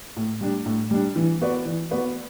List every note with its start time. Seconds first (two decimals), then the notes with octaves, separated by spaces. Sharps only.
0.16 A2
0.41 G3 D4
0.66 A2
0.91 G3 D4
1.16 E3
1.41 B3 F#4 B4 D5
1.66 E3
1.91 B3 F#4 B4 D5